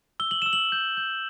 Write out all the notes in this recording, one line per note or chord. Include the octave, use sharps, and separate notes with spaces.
E6 G7
F#7
E6 E7
F#7
G6
G6